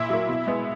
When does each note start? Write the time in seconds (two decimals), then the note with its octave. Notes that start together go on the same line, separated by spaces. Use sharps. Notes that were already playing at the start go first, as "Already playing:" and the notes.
Already playing: A#2 E4 E5
0.10 F#3 A#3
0.29 B2
0.47 G#3 B3